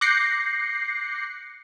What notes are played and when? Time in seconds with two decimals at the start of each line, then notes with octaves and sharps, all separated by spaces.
0.01 D6 F#6 G6 A#6 C7 C#7